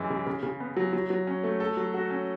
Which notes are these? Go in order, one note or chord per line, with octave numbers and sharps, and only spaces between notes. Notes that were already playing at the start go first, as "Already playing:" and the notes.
Already playing: F#2 E3 G#3
C#3
C#3
C#3
B3
F#3
F#3
F#3
C#4
A3
A4
F#3
F#4
C#4